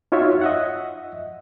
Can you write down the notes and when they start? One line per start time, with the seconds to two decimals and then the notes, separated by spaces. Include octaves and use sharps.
0.12 D#4 F4 F#4 C#5 E5
0.41 D#5 E5 F#5